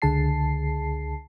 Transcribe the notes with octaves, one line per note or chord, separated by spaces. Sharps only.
C#2 D3 G#4 A5 C7